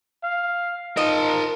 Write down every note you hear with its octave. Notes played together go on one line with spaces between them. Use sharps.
F5
D#4 F4 A#4 D#5 A5